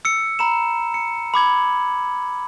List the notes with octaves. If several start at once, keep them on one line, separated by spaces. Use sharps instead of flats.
E6 C#7
A#5 B5 E7
C#7
B5 D6 G#6 F#7